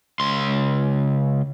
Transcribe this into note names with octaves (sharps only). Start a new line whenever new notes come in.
C#2 C6